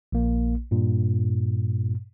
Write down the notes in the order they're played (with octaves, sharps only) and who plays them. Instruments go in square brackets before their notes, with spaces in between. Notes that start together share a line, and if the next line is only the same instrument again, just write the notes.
[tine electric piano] A#1 A#3
G2 A#2